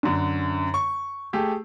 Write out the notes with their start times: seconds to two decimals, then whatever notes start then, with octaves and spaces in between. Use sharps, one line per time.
0.03 F#2 D3
0.74 C#6
1.33 A3 G4 G#4